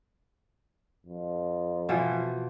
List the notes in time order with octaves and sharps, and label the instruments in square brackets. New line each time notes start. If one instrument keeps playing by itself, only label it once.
[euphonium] F2
[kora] B2 E3 F3